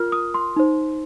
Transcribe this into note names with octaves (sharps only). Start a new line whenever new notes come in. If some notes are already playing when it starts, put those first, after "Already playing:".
Already playing: F4 A#4 F6
D#6
C6
D#4 C5